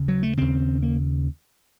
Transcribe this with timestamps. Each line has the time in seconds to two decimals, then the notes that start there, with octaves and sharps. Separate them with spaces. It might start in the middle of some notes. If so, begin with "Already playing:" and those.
Already playing: D#2 C#3
0.08 F#3
0.23 A3
0.37 D#2 C#3 C4
0.82 A#3